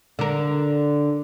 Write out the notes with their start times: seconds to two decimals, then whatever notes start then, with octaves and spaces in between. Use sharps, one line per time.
0.19 D3 A#4